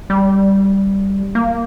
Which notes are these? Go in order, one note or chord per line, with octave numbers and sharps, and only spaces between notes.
G3
A#3